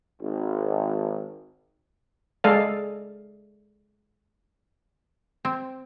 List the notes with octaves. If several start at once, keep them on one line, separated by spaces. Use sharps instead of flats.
G#1
G#3 A4 D5 F5
C4